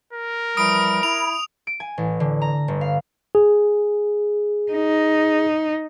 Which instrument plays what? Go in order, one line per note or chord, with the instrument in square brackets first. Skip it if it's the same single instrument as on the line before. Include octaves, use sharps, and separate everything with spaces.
[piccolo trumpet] A#4
[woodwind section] E3 F3 G3 [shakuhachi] B5 [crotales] D#6 D7
[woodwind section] E4 [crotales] F7
[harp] D7
G#5
A1
D3
A#5
G1
F5
[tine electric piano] G#4
[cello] D#4